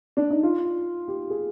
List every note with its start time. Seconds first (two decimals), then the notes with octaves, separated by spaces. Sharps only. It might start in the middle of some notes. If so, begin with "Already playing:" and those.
0.17 D4
0.30 D#4
0.43 F4
1.08 G4
1.30 G#4